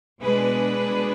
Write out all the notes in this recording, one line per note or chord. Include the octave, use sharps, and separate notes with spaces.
B2 G#3 D4 G#4 B4